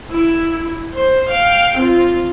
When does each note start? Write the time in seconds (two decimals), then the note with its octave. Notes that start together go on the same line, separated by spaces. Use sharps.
0.11 E4
0.93 C5
1.30 F5 G5
1.78 C4 F4